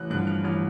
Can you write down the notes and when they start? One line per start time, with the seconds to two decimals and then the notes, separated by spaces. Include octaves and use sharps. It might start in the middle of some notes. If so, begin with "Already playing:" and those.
Already playing: A1 F#6
0.10 G2 D3 F3 F#6
0.27 F6
0.44 A1 F6